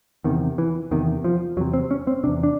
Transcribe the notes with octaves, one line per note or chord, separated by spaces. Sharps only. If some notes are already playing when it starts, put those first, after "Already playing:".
E2 C3 D#3
E3
E2 C3 D#3
F3
E2 C3 F#3
C4
C#4
C4
E2 C3 D4
D4